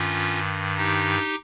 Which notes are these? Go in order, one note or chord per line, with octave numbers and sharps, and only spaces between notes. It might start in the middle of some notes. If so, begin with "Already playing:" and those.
Already playing: G2 D#3 C#4 F4
D#4 G4